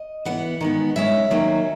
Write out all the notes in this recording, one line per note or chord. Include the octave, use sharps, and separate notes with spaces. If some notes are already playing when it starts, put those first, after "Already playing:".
Already playing: D#5
E3 B3 F#5
D#3 G#3 B3
C#3 G#3 C#4 E5
D#3 F#3 A#3 C#4